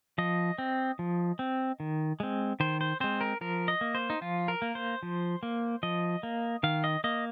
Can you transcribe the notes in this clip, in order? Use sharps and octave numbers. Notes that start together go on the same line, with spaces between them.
F3 D#5
C4
F3
C4
D#3
G#3 C4
D#3 C5
C5
G#3 C4 C5
A#4
F3 A#4
D#5
A#3
C5
D#4
F3 F4
A#4
A#3
C5
F3
A#3
F3 D#5
A#3
D#3 F5
D#5
A#3 D#5